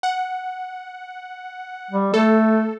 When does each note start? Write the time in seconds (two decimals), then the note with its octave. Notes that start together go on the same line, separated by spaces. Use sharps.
0.03 F#5
1.91 G3
2.14 A3 A4